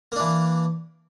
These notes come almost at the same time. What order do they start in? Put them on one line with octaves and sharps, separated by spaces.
A#3 D4 E3